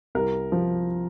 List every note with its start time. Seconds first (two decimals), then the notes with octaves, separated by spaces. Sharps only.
0.15 C2 A#4
0.52 F3